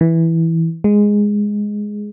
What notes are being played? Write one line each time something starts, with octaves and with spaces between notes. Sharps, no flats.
E3
G#3